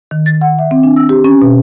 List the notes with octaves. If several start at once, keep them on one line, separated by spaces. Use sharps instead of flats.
D#3
A6
F#5
E5
C4
D4
E6
G4
C#4
B2